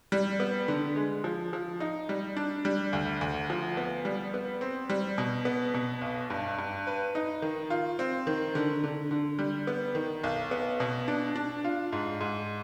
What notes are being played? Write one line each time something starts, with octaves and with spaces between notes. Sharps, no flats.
G3
B3
D3
G#3
F3
F3
D#4
G3
D4
G3
D2
D2
F3
B3
G3
B3
C4
G3
B2
B3
B2
B1
G2
G2
B4
D#4
D#3
F4
C4
D#3
D3
D3
D3
G3
B3
D#3
B1
B3
B2
D4
D4
F4
G#2
G#2